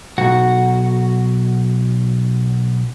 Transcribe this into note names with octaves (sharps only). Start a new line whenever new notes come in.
B1 F#4